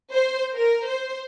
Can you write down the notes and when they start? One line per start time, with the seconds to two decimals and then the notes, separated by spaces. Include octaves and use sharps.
0.13 C5
0.57 A#4
0.87 C5